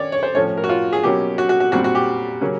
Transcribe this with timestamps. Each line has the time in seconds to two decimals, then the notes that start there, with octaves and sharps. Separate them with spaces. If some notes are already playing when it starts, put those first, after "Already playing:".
Already playing: D#3 C#4 C#5 D5
0.12 C#5
0.23 C5
0.35 A2 F3 A3 C#4 C#5
0.57 A#4
0.64 F#4
0.69 F4
0.93 G#4
1.03 B2 F#3 A#3 C#4 G4
1.38 F#4
1.49 F#4
1.60 F#4
1.72 A#2 G3 C4 F#4
1.84 F#4
1.95 G4
2.41 C#3 F#3 A#3 C#4